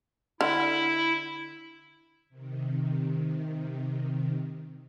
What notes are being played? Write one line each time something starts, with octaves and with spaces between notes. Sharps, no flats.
D3 E4
C3 D#3